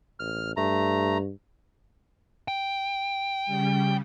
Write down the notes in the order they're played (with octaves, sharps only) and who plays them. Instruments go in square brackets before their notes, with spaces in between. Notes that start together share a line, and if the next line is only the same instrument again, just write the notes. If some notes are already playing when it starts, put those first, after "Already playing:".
[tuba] A1 [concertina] F6
[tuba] G2 [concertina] A3 A#5
[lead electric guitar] G5
[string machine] C#3 G3